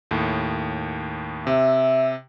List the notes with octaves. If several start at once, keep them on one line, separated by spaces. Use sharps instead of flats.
D#2 A2
C3 E5